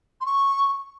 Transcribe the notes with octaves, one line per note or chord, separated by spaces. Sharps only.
C6
C#6